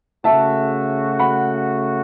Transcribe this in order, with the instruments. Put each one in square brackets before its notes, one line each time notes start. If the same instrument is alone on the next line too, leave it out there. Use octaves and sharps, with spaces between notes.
[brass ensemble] C#3 A3 F#4 [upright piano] E5 A5
[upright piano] F#5 B5